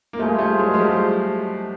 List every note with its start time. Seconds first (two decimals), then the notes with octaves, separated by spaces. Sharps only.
0.13 A#3
0.19 G3 A3 F4 G#4 C5
0.39 G3 A3
0.59 F#3 G#3
0.74 G#3
0.78 F3 G3